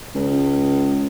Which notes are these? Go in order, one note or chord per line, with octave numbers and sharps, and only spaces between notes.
C#2